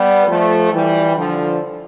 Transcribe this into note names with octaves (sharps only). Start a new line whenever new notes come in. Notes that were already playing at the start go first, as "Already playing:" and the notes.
Already playing: G3 B3
F3 A3
E3 G3
D3 F3